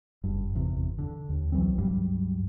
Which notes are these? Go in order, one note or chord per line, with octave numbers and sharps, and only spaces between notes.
F#1 G2
G1 E2 C3
D3
D#2
C2 E3 F#3 C4
C#2 G2 F#3 G3